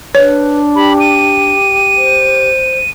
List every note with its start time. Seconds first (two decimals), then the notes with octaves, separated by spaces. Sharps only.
0.15 D4 B4 C#5
0.76 G4 B5
1.00 D#7
1.96 C5